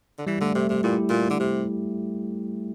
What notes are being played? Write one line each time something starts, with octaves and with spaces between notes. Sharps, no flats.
D3
E3 G3
D3 A3
C3 A3
C3
A#2 E4 G4
A#2
D3
C3